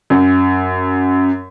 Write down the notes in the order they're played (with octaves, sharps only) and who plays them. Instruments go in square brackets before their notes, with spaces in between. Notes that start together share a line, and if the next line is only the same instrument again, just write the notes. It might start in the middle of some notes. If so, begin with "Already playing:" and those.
[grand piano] F#2